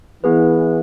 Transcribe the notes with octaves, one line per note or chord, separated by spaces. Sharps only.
E3 B3 G#4 B4